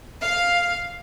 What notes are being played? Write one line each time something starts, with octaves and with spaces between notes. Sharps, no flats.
F5